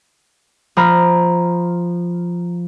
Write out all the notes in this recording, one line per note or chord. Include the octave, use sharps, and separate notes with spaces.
F3 A#5 B5 F6